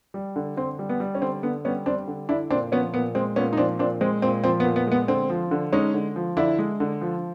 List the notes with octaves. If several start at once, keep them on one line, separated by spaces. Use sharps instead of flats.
G3
D3
D3 C4
G3
B3
G3
C#4
D3 C4
D3 B3
G3 B3 C#4
G3 C4 D4
D3
D3 D4 E4
A#2 C4 D4
F3 B3 C#4
A#2 B3
G#3 C4
A#2 B3 C#4
D#4
F3 C4 D4
A#2 C4 D4
G#3 C4
A#2 C4
F3 C4
B3
A#2
B3
G#3 B3
D3 C4
F3
D3
G#3 C#4 D#4
D3
F3
D3 D4 E4
G#3
D3
F3